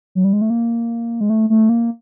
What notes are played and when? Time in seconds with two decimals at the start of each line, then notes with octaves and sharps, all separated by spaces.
0.15 F#3
0.24 G3
0.33 G#3
0.41 A3
0.50 A#3
1.21 G#3
1.30 A3
1.50 A3
1.69 A#3